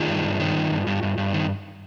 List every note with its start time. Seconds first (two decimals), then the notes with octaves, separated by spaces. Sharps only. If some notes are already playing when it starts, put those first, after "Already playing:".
Already playing: D#3 F4 G#4
0.08 G2
0.24 G2
0.40 D#3
0.56 G2
0.71 G2
0.87 G2
1.03 G2
1.18 G2
1.33 D#3